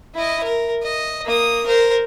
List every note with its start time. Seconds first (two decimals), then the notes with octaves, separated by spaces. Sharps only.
0.15 E4 D#5
0.44 A#4
0.82 D#5
1.25 A#3 D#6
1.66 A#4 C5